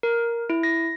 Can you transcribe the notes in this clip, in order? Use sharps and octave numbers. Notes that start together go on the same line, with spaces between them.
A#4
E4
A#6